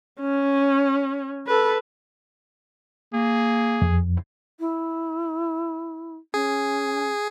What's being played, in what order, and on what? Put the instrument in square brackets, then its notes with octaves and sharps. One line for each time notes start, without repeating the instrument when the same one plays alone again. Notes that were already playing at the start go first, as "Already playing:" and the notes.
[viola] C#4
A4 B4
[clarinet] A#3 [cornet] G#4
[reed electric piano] F2
[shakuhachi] E4
[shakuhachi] C#4 [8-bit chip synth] G#4